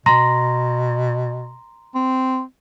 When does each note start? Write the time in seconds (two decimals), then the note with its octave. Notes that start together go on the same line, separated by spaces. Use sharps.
0.06 B2 A#5 C6 A#6
1.95 C4